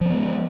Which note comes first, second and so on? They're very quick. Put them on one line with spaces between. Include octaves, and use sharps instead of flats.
F3 C4 B3 G#3